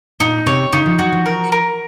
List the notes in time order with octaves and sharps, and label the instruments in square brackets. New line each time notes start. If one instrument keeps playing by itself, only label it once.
[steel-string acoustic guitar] A#2 [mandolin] D#4
[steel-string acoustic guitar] C3 [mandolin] C#5
[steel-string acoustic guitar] C#3 [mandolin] D#4
[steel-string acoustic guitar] F3
[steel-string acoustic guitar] F#3 [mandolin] F#4
[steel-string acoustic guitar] F3
[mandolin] A#4
A#4